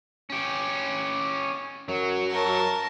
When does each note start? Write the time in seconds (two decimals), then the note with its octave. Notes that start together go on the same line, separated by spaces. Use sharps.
0.30 C#4 G4
1.88 F#2 F#3
2.30 A#4 A5